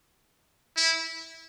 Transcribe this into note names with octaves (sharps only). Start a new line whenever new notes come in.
E4